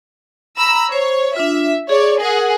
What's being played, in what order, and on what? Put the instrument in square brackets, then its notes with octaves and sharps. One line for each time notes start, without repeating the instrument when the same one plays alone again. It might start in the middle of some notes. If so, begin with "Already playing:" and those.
[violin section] A#5 B5 E6
[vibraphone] C5 [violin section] C#5
[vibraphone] D4 F4 [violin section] E5
[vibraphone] G#4 [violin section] C#5 D5
[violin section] G#4 F#5 [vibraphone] A#4